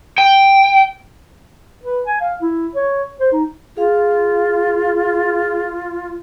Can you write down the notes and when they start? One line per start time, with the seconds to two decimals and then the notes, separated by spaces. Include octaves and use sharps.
0.18 G5
1.83 B4
2.07 G#5
2.21 F5
2.41 E4
2.75 C#5
3.20 C5
3.32 D#4
3.77 F4 G#4 F5